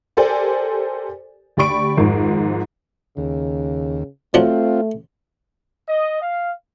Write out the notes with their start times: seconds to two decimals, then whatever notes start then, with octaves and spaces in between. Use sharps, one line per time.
0.17 G4 A4 A#4 C5 D5 G#5
1.57 D2 G4 D5 B5 C#6 D7
1.97 G#1 F2 G#2
3.17 D#2 C#3
4.34 F3 F#3 A3 C4 D4 F4
5.88 D#5
6.21 F5